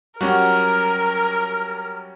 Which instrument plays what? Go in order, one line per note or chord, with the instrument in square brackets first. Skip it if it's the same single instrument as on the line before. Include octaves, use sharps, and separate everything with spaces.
[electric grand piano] F#3 G3 C#4 [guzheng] F#4 [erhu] A#4